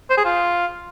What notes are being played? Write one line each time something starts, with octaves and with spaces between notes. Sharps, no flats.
C5
G#4
F4